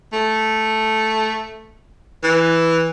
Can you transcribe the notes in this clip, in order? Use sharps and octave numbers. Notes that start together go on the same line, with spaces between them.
A3
E3